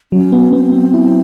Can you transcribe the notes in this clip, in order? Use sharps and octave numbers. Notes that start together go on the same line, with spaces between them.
F#3 C#4
B3
B3 C4
B3
E4